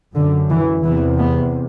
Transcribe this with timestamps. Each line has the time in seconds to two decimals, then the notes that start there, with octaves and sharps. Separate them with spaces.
0.15 F#2 D3
0.50 E3
0.84 E2 C3 E3
1.19 B3